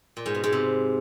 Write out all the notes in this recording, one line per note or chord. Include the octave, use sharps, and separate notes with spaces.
A#2
G#2
B2
G#2
C3